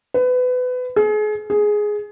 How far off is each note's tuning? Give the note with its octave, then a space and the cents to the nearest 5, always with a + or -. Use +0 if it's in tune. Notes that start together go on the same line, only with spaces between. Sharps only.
B4 +25
G#4 +35
G#4 +5